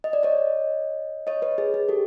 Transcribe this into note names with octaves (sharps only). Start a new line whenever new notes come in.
D#5
D5
C#5 D#5
C#5 D#5
B4 C#5
G#4
G#4
G4 A4